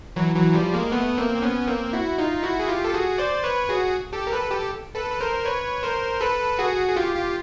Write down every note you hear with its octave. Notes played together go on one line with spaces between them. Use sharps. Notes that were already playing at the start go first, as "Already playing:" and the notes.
E3 F#3
E3 F#3
F3 G3
G#3 A#3
A3 B3
A#3 C4
C4
B3 C#4
A#3 C4
E4 F#4
D#4 F4
E4 F#4
G#4
F4 G4
A4
F#4 G#4
C5 D5
B4 C#5
F#4 G#4
G4 A4
A#4
A4 B4
G4 A4
A4 B4
B4
A#4 C5
B4 C#5
A#4 C5
A4 B4
F#4 G#4
G#4
F4 G4
F4 G4